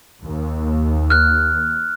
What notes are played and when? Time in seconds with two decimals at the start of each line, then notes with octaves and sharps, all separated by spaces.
0.23 D#2
1.10 F6 F#6